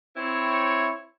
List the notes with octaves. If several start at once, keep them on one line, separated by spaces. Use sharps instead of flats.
C4 E4 C#5